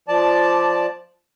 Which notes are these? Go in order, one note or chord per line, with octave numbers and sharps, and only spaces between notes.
F3 D5 A5